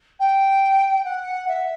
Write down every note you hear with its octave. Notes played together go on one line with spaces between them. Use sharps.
G5
F#5
E5